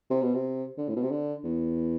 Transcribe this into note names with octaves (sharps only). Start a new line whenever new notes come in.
C3
B2
C3
D3
A2
B2
C3
D3
E2